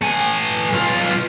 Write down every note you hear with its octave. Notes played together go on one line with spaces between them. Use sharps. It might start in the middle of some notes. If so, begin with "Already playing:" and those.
A3 G#5
B1 F4